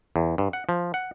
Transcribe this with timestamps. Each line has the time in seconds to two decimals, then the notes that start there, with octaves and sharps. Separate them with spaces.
0.16 E2
0.38 G2
0.53 F#5
0.69 F3
0.94 F#5